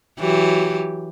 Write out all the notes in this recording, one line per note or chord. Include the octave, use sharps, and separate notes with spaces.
E3 F#3 G4